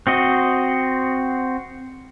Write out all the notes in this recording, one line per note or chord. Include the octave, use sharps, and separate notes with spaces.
C4 F#4 D#5